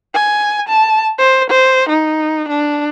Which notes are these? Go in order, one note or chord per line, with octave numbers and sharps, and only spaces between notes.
G#5
A5
C5
C5
D#4
D4